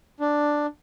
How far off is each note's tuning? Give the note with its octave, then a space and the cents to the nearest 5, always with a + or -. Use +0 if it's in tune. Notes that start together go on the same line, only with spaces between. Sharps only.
D4 +5